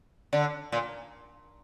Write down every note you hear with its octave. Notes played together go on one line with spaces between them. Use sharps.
D3
A#2